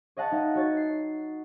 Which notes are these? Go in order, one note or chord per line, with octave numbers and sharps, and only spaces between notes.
C#5 D#5 F5 F#5 A5
D#4
F#4 C#5 A6
C7